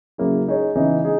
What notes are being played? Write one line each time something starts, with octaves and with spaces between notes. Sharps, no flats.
C#3 F#3 A#3 E4 G#4
G#3 D#4 G#4 C#5
C#3 E3 B3 D#4
G#3 D#4 G#4